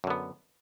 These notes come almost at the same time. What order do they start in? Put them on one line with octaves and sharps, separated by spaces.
F#2 D3 B3